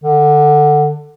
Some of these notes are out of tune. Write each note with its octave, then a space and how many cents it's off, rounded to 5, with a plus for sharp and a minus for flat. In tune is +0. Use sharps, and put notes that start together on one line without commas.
D3 +15